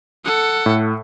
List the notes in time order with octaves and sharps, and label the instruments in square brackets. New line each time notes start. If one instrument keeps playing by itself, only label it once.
[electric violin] A4 F#5
[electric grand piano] A2